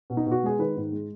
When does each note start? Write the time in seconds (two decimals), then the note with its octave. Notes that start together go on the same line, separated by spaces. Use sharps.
0.10 B2
0.17 D#4
0.26 B2 F#4
0.43 G#3 G#4
0.59 D#3 B4
0.76 G#2
0.92 G#3